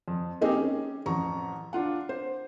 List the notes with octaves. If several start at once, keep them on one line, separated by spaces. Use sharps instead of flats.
F2
A#3 C4 D#4 G4 G#4
C#4
A1 F2 A#5 C#6
D4 F4 F#5
C5